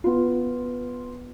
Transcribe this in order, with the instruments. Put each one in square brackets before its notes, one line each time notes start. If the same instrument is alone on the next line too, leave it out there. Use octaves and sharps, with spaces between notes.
[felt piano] B3 F4